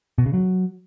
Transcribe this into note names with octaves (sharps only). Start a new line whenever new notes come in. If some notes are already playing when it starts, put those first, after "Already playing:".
B2
C#3
F#3